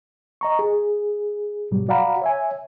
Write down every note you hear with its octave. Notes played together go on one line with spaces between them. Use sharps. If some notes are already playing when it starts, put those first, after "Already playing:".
D#5 A#5 C#6
G#4
G#2 B2 F#3 G3
F#4 D5 F5 F#5 A#5 B5
C#5 E5 G#5